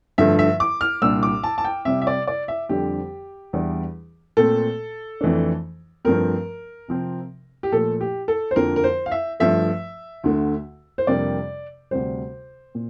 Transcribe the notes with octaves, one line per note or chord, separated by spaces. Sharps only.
G2 D3 F3 A3 E5
E5
D6
F6
C2 A#2 G3 D4 E6
D6
A5
A5
G5
C3 G3 C4 E5
E5
D5
D5
E5
F2 D3 G3 C4 G4
E2 E3 G3 D4
A#2 A3 C4 A4
F2 E3 A3 D4
G2 F3 A3 C4 A#4
C3 F3 C4
G4
A#2 F3 A3 A4
G4
A4
C5
F2 D3 F3 A#3 A#4
A#4
C5
F5
E5
G2 F3 A3 E5
D2 D3 A3
C5
F2 C3 G3 A#3 D4 D5
D2 C3 G3 C5
A#2